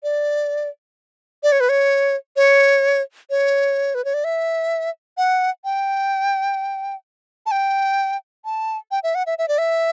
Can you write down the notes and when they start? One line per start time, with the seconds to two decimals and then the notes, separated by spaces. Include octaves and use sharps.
0.03 D5
1.43 D5
1.52 C#5
1.60 B4
1.69 C#5
2.36 C#5
3.30 C#5
3.95 B4
4.05 C#5
4.14 D5
4.24 E5
5.17 F#5
5.65 G5
7.46 A5
7.51 G5
8.45 A5
8.91 G5
9.03 E5
9.15 F#5
9.27 E5
9.38 E5
9.48 D5
9.58 E5